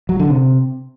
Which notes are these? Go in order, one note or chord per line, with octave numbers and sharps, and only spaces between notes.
F#3
D3
C3